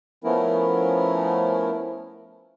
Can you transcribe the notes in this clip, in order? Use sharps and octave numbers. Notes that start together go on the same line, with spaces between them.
F3 A3 B3 C#4 E4 A#4